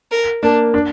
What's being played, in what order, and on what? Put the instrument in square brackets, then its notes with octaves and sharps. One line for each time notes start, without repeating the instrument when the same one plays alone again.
[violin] A#4
[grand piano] A#3 [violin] D4
[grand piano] D4